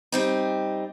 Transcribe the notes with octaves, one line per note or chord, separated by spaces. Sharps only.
G3 C4 D#4